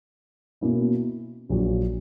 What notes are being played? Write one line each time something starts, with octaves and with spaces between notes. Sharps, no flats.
B2 A#3 C#4 E4
A#1 A#2 F#3